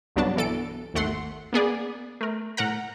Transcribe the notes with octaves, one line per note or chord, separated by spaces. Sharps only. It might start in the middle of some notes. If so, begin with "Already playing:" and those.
C2 G2 F#3 B3 D4 A5
B2 E3 A4 D7
G#1 D#2 A3 F#5 C6
A#3 B3 G#4 D5
A3 A#4
A2 A#4 F#5 A#5